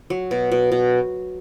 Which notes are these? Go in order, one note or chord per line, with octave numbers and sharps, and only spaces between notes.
F#3
B2
B2
B2